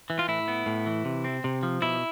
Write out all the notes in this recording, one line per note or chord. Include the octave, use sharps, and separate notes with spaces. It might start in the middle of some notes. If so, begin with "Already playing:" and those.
E3
F4
A2 E4
B3
A2
E3
C3
C4
C3
F3
B2 E4